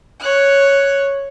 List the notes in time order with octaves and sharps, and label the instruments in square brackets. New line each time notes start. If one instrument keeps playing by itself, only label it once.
[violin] C#5 F#6